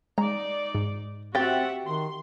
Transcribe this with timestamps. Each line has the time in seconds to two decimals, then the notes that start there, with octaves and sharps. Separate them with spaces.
0.18 G#3 D#4 D5 A#5
0.75 G#2
1.35 C4 F#4 G4 E5 F#5 G5 A6
1.86 D#3 C6